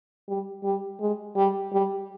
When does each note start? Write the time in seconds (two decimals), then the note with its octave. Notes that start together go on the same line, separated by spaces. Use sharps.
0.29 G3
0.64 G3
1.00 G#3
1.36 G3
1.72 G3